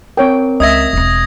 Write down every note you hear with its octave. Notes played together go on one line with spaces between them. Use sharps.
C4 A#4 C#5 G5
C#2 D#5 E5 D#6 G#6 A#6
E1 C4